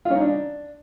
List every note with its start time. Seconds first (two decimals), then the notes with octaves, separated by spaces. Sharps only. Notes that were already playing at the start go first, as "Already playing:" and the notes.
0.05 F4
0.10 C#4
0.15 D#4
0.20 D4